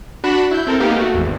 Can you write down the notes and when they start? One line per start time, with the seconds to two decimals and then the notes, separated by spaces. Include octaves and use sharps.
0.24 D4 F#4 B5 F#6 E7
0.51 E4 G6
0.67 C4 A4 A#4
0.80 A#3 B3 D#4 G4 F5
0.96 A3 F#4
1.14 G#1 E2